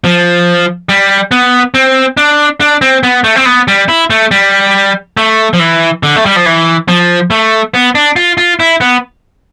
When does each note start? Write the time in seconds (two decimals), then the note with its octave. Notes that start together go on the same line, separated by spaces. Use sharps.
0.04 F3
0.89 G3
1.31 B3
1.74 C4
2.17 D4
2.60 D4
2.82 C4
3.03 B3
3.24 A3
3.36 C4
3.45 B3
3.68 G3
3.88 E4
4.10 A3
4.31 G3
5.17 A3
5.53 F3
5.59 E3
6.03 D3
6.16 A3
6.26 G3
6.36 F3
6.46 E3
6.88 F3
7.31 A3
7.74 B3
7.95 D4
8.16 F4
8.37 F4
8.60 E4
8.81 B3